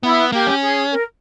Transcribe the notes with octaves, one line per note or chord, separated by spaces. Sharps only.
B3 E4
A#3 G4
C#4
G#4
A#4